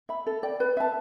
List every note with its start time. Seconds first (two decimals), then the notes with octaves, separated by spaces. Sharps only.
0.09 E5 B5
0.26 A4
0.43 D5 G5
0.60 B4
0.77 E5 A5